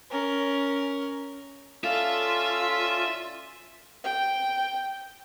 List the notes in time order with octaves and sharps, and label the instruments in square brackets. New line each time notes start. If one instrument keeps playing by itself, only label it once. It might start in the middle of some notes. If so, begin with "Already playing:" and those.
[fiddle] C#4 A#4
[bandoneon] C#4 D5 F5 [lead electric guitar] F4 [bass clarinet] A4 [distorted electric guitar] E5
[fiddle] G5